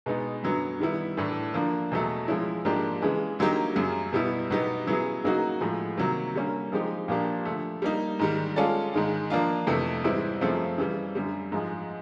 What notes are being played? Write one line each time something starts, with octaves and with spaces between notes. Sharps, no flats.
B2 G#3 B3 D#4
F#2 D3 F#3 B3
D#3 G3 B3 E4
A2 E3 A3 D4
D3 F3 A#3 D4
E2 B2 F#3 A3
F3 G#3 C#4 E4
G#2 F3 A#3 D4 G4
C#3 E3 G#3
D3 F#3 A#3 D#4 G4
F#2 C#3 F#3
B2 G3 B3 E4
B2 F#3 B3 D#4 G4
C#3 F#3 B3 E4 G#4
C#3 F#3 A#3 D#4 F#4
A2 F3 G#3
C3 D#3 F#3 A#3
D3 G3 A#3 C#4
F3 G#3 C4 D#4 G4
A#2 F3 A#3 D4 G4
D3 F3 A3
G3 A#3 D#4
G#2 D#3 G3
G#3 C#4 F4 A4 D5
G#2 D#3 G#3
F3 A#3 D4 F4
F2 C3 E3 A3
G#2 E3 G3 C4 E4
F#2 C#3 F3 A3 C4
C#3 E3 G3
F#2 D3 G3
G#2 F3 G#3